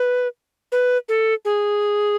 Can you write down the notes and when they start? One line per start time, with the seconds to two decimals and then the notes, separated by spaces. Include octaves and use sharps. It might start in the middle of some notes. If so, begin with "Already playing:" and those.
Already playing: B4
0.72 B4
1.09 A4
1.45 G#4